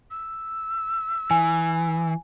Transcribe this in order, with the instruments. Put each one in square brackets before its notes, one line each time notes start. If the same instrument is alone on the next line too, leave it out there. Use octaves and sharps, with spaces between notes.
[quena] E6
[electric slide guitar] E3 [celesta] G#5